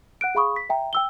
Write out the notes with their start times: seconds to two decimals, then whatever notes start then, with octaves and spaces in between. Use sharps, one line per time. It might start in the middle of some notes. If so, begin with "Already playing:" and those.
0.21 F#5 F#6 D7
0.35 G#4 F5 B5 C#6 D#6
0.56 B6
0.70 E5 G5 A#5
0.93 G5 E6 G7